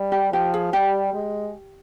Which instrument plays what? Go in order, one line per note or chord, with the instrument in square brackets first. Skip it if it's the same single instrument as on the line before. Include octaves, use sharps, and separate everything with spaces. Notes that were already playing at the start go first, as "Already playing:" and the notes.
Already playing: [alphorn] G3
[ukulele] G4
[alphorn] F3 [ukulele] G4
[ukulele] G#4
[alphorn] G3 [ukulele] G4
[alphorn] G#3